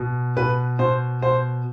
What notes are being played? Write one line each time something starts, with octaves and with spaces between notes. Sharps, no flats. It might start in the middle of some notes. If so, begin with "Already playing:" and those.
Already playing: B2
B2 B4
B2 C5
B2 C5